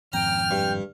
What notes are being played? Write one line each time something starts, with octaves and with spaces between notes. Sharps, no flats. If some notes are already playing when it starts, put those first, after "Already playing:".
G#1 F2 G5 A#5 F6
G2